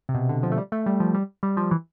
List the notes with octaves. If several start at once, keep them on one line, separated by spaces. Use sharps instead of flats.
C3
B2
D3
F3
A3
G3
A3
G3
F3
G3
G3
F3
E3